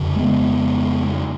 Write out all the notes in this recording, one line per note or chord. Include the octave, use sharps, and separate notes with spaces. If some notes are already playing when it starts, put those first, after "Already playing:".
Already playing: F2 C#3
G#3 B3